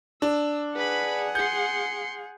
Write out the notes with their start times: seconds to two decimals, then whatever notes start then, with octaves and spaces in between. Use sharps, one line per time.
0.22 D4 E6
0.75 G#4 B4 F#5 B5
1.35 C6 G6 C#7